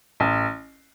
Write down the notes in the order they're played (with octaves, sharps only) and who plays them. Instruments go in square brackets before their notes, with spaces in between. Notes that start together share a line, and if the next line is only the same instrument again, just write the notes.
[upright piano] A1